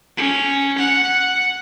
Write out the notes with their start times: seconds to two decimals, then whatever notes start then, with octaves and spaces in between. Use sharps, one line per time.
0.17 C#4
0.78 F#5